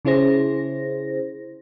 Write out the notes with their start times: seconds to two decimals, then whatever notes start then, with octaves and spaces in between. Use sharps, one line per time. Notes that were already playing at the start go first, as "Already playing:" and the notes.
0.05 C#3 C#4 E4 G#4 C5 A#6